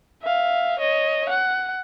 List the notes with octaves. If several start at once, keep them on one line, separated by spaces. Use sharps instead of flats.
E5 F5
C#5 D#5
F#5